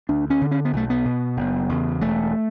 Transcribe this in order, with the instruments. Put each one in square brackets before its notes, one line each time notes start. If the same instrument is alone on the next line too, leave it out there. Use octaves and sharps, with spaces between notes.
[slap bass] D2 D4
C#4
D3
C#4
B3
B1 A3
B3
B2
F#1
E2 C#3
E1 A3